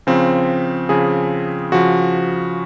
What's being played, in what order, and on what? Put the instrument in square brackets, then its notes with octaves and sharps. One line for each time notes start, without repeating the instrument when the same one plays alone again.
[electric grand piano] C#3 F3 C4
C#3 F3 G#4
C#3 F3 F#4